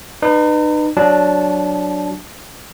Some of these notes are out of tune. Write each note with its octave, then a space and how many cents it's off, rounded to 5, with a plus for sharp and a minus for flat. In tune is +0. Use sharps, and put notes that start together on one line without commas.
D#4 -40 B4 +0
F#3 +0 D4 +0 A5 -25